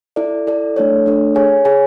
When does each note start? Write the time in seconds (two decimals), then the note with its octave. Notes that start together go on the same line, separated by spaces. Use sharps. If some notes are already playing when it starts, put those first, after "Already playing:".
0.16 E4 A4 D5
0.47 E4 A4 D5
0.76 A3 D4 A4 C#5
1.06 A3 D4 A4 C#5
1.35 G#4 C#5 G#5
1.65 G#4 C#5 G#5